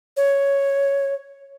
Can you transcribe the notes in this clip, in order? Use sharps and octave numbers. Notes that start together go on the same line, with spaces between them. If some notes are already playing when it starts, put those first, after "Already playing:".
C#5